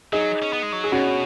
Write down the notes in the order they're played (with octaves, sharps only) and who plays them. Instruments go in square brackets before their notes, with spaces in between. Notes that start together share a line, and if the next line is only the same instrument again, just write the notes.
[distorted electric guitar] F#3 [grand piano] D#4 G#4
[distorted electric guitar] C#4
B3
G#3
F#3
[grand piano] G#4
[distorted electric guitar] B2 [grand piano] C#4 F#4